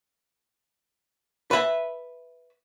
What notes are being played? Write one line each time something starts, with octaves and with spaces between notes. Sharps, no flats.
B4 E5